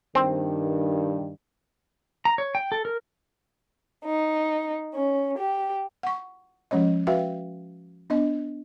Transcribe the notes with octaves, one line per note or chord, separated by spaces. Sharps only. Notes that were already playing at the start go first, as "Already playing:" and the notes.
G2 D#3 C4
A#5
C#5
G5
A4
A#4
D#4
C#4
G4
F#5 C#6
F3 G#3 C#4 C#5 D#5
F#4 B4 E5 F5 G5
B3 D4 D#5